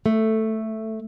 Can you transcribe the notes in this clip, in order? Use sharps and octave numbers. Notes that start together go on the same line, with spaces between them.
A3